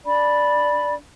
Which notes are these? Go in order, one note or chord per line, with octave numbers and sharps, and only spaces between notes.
D4 D5 B5